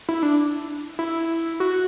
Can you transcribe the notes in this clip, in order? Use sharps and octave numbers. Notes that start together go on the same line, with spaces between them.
E4
D4
E4
F#4